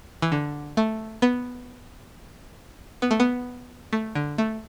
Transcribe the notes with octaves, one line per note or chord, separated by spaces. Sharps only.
E3
D3
A3
B3
B3
A3
B3
A3
D3
A3